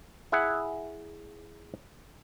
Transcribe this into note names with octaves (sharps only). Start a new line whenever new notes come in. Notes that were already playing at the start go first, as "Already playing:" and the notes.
E4 G#4 E5 F#5